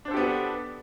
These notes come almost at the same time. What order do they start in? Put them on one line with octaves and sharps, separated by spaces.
D4 C5 A4 G4 B3